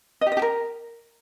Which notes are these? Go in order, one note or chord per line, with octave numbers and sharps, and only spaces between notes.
D#5
G4
D#5
G4
A#4